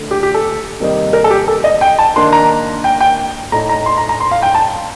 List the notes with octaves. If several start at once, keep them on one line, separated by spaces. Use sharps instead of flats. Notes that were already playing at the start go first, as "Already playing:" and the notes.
Already playing: D3 A3
G4
G4
A4
C3 D#3 G3 A#3 D#4
A#4
A4
G4
A4
D#5
G5
A5
D#3 A#3 D4 C6
A#5
G5
G5
A2 A3 D#4 A#5
A#5
C6
A#5
A#5
C6
F5
G5
A5